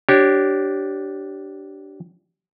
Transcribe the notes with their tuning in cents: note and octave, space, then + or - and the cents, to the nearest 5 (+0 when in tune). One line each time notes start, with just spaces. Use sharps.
D4 +0 G4 -25 C#5 -20